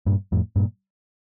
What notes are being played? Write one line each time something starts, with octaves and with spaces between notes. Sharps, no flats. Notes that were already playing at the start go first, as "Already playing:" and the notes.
G2 A#2
F2 A2
G2 A#2